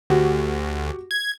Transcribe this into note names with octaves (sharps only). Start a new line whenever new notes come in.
D2 F#4 G4
G#6